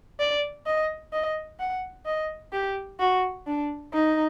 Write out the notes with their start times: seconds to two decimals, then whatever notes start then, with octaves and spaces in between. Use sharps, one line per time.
0.20 D5
0.66 D#5
1.13 D#5
1.60 F#5
2.06 D#5
2.53 G4
3.00 F#4
3.47 D4
3.93 D#4